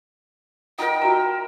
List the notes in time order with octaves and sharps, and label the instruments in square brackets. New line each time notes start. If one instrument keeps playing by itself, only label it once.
[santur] D#4 A#4 [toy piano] F4 F#5 [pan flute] G5
[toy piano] F4 F#4 A#5 [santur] E5